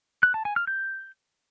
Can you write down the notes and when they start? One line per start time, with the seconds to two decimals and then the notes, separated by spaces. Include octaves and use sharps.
0.23 F#6
0.34 A5
0.45 G#5
0.56 F6
0.67 G6